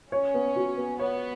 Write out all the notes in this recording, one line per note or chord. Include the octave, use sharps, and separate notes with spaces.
C#4 C#5
B3
F#4
B3
B3 C#5